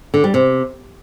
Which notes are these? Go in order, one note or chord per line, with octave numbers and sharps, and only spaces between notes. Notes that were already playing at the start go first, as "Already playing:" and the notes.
D3
G3
C3